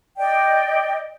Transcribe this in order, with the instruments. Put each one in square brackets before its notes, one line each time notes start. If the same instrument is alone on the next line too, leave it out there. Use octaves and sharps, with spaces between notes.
[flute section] D5 D#5 G5